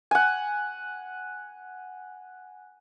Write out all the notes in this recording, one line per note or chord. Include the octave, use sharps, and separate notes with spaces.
F#5 G#5